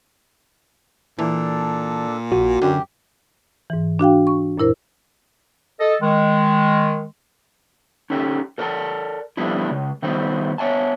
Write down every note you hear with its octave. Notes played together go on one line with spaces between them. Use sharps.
A#2 E3 D4 A4
A#1 F#4
F#2 D3 G4
G#2 E3
D4 F#4 F5 G5
C#6
F#2 A#2 E4 A#4 C5
A4 D#5
D#3 G#3
C#4 D#4 G4 A4
A4 A#4 D5 G5 A5
F3 G3 A3 B3 D4 E4
C#3 G#3
D#3 G3 A3 B3 D#4 C5
B3 C#5 E5 G#5 A5